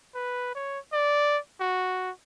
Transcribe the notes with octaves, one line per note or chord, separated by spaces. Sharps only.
B4
C#5
D5
F#4